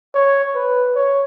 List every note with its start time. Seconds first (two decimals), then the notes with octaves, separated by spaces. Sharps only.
0.14 C#5
0.55 B4
0.95 C#5